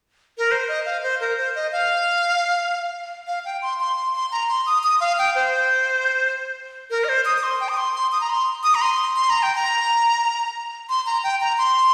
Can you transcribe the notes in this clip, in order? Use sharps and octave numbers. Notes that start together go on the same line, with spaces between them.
A#4
C5
D#5
F5
C5
A#4
C5
D#5
F5
F5
G5
C6
C6
C6
C6
A#5
C6
D#6
D#6
F5
G5
C5
A#4
D#5
C5
D#6
D#6
C6
G5
D#6
C6
C6
D#6
A#5
C6
D#6
A#5
C6
C6
A#5
G5
A#5
C6
A#5
G5
A#5
C6